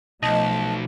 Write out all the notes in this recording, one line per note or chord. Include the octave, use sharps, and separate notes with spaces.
B1 F3 A3 D#5 A5